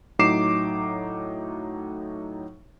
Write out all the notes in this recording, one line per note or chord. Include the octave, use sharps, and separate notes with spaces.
A2 F#3 D#4 D6 C7 E7